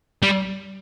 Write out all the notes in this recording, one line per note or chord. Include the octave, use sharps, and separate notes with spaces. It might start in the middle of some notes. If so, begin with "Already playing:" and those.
G3